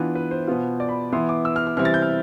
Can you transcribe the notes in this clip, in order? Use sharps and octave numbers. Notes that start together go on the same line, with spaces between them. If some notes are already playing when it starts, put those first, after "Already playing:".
Already playing: E3 B3 D4 F4 B4
B4
C5
B2 B3 F4
D5
B5
E3 B3 E4 C6
D6
E6
F6
F6
C3 E3 G3 C4 E4 F6
A6
G6
F6